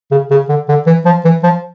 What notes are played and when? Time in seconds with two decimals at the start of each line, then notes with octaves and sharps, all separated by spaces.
0.11 C#3
0.31 C#3
0.49 D3
0.68 D3
0.87 E3
1.05 F3
1.25 E3
1.43 F3